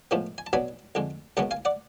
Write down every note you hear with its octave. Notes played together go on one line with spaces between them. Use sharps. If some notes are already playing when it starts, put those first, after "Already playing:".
A2 F3 G#3 B3
G#5
A5
B2 F#3 B3 D4 G#5 B5
F2 D3 G#3
F#2 C#3 G#3 B3 F#5 A5
F5 G#5
D5 F#5